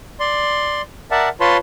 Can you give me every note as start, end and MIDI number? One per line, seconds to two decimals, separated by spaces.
0.20 0.82 74
0.20 0.82 84
1.11 1.29 70
1.11 1.29 74
1.11 1.29 76
1.11 1.29 78
1.11 1.29 81
1.40 1.57 65
1.40 1.57 71
1.40 1.57 73
1.40 1.57 81
1.40 1.57 83
1.40 1.57 84